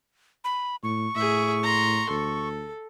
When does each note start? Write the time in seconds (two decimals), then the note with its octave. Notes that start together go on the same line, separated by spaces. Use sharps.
0.44 B5
0.83 A2 C#6
1.16 A2 G#4 E5
1.63 A#5 C6
2.10 D2 A4